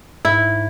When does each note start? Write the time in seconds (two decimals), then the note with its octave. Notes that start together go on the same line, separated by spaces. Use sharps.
0.25 G#2 E4